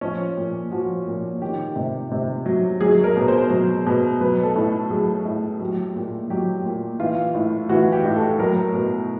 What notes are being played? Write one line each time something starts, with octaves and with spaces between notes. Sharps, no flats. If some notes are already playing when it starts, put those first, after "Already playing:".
F3 C#4
A#2
F3 F#4
A#2
D#3 G4
C3
C3
F#3
F#3 G#4
A#4
B2
C5
F#3
B2
F#3 B4
A4
A2
F#3 G#4
A2
F#3 G4
A#2
F#3 G4
A#2
E3 F4
A2
E3 F#4
G4
A2
A4
F#3 A#4
B2